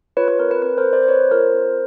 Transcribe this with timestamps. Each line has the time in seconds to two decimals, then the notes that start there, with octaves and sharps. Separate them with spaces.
0.17 F4 B4 C#5
0.28 B4
0.39 C4 A#4
0.51 B4
0.62 C4 B4
0.78 A#4 C5
0.85 C4
0.93 C5 D5
1.03 C5
1.08 C4 B4 C#5
1.31 F4 A#4 C5
1.54 C4